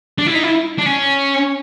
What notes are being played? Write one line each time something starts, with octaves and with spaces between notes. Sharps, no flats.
D4
E4
D#4
E4
D4
C#4